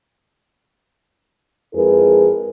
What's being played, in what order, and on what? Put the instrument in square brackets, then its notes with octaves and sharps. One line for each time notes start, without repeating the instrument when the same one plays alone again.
[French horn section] F2 G#3 E4 G#4 A#4 B4